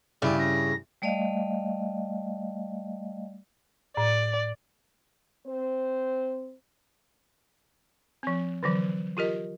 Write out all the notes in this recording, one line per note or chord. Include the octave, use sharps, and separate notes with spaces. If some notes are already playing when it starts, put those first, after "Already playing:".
G2 C#3 E4 D5 G5
A#6
G3 A3 D5 D#5 F5
A2 D5
C4 C5
F3 C4
D3 E3 F#3
F4 G4 A#4 D#5